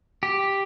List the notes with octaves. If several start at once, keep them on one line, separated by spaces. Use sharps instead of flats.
G4